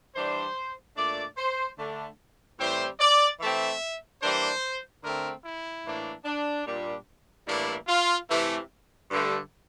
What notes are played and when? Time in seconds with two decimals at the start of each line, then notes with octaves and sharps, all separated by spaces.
0.15 E3 G3 D4 C5
0.96 A#2 A3 D4 D5
1.37 C5
1.78 D3 A3 D4
2.59 A2 E3 G3 C4 C5
3.00 D5
3.40 E3 A3 C4 E5
4.22 E3 G3 A#3 D4 C5
5.03 D3 A3 C4 A#4
5.44 E4
5.85 A2 E3 A#3 D4
6.25 D4
6.66 A#2 G3 D4
7.47 A2 E3 G3 A#3 D4 E4
7.88 F4
8.28 C3 E3 A3
9.10 G2 D3 A3